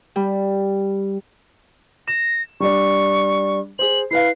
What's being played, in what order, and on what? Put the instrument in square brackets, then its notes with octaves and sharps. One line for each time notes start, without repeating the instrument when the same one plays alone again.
[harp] G3
[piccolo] A#6 [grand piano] E7
[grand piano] G3 D4 [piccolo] C#6
[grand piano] G#4 C5 [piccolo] F#7
[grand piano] E4 B4 F5 [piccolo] C7